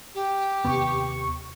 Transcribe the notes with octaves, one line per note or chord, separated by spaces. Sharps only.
G4
D#2 C3 B3 C#6